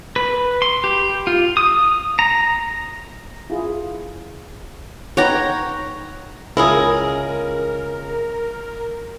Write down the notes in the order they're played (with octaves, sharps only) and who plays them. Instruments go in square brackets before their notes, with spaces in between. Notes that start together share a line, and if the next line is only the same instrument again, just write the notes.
[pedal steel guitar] B4
C6
G4
F4
D#6
A#5
[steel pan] E4 F4 G#4
[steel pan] D#4 B4 [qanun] C#5 A#5 [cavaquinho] F#5 G5 D6
[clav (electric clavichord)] C#2 [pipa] E4 G#4 [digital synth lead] A#4